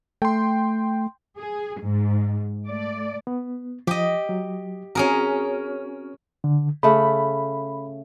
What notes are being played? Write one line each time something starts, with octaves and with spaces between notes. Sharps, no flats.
A3 G5 C6
G#4
G#2
A3 D5
B3
F3 G4 D#5
F#3
C4 C#4 F#4 G#4 A#4
D3
C#3 A3 B5